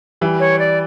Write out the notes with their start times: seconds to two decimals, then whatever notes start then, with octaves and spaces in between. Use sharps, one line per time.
0.21 E3 G3
0.40 C#5
0.59 D5